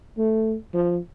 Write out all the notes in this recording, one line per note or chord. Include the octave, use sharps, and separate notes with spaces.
A3
F3